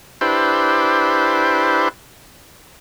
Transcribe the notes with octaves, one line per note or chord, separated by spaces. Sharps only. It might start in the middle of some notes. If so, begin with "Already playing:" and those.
D4 E4 G4 B4 C5